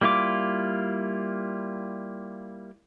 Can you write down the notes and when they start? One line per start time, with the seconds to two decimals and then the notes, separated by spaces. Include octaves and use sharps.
0.01 G3 A#3 E4 F4 D6